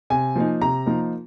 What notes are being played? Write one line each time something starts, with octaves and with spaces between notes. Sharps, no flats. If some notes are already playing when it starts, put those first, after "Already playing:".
C3 G#5
F3 A#3 D#4
C3 A#5
F3 A#3 D#4